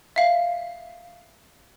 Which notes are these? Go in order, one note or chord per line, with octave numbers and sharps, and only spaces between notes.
E5 F5